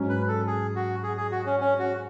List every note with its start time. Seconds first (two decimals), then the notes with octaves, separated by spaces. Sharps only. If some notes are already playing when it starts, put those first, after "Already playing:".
Already playing: G#2 F#3 C#4
0.09 B4
0.28 A4
0.47 G#4
0.76 F#4
1.03 G#4
1.17 G#4
1.32 F#4
1.46 C#4
1.61 C#4
1.79 F#4